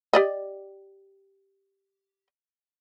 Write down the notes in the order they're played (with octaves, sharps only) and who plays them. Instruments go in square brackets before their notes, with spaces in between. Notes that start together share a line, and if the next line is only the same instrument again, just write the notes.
[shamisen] G4 D5 D#5